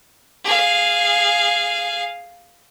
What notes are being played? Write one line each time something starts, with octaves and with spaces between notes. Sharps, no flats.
G#4 F5